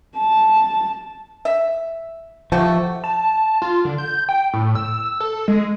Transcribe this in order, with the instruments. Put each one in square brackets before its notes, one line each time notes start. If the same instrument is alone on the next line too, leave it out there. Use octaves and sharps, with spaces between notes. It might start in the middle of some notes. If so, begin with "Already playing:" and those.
[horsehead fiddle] A5
[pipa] E5
[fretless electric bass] F3 [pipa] A3 F#4 G4
[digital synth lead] A5
F4
D3
G6
G5
A2
E6
A4
G#3